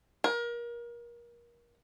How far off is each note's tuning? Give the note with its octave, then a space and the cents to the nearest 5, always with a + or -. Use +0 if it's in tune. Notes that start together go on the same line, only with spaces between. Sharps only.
A#4 +30